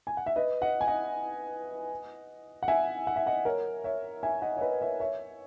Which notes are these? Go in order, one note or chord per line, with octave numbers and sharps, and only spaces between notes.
G#5
F#5
E5
B4 D#5
D#5 F#5
G#5
D#5 F#5
F#5
E5 G#5
F#5
E5
D#5 F#5
A#4 C#5
C#5 E5
E5 G#5
D#5 F#5
C#5
B4 D#5
C#5 E5
C#5 E5